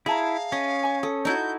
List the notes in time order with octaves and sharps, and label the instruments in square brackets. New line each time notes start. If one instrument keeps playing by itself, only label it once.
[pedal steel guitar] E4 [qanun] G#4 [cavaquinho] E5 A5 A#5 [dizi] F5
[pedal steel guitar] C#4 [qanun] D#5
[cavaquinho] G#5 C#6
[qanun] A4 [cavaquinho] D#6
[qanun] D#4 E4 F#4 [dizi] G6